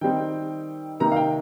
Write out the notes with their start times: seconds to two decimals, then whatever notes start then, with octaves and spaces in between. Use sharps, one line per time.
0.01 D#3 G3 C4 D#4 G5
1.00 C3 D#3 A#3 D#4 A#5
1.12 F5
1.16 G5